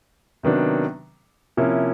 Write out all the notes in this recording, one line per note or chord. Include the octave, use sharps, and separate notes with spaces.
C3 D#3 F#3 B3 D4
C3 F3 A#3 C#4 E4